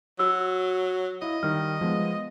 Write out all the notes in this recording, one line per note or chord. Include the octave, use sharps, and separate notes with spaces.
F#3 F#4 E6
E4 D#5 F5
D#3 G3 F6
F3 G#3 B3